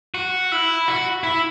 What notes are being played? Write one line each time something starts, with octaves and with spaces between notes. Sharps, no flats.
F#4
E4
F#4
E4